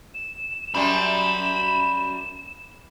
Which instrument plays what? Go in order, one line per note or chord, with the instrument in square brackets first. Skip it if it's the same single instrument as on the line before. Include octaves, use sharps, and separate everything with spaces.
[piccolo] E7
[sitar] F#2 F#3 G3 [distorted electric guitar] B5 C6